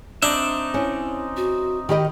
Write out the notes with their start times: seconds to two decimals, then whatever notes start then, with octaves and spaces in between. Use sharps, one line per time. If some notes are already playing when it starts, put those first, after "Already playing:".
0.23 C4 D4 D#4 E5
0.74 C#4 E4
1.37 F#4
1.89 D#3 G4 D#5 B5